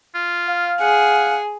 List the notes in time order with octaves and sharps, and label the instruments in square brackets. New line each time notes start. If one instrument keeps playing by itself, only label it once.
[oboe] F4
[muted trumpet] F5
[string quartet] G#4 [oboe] F#5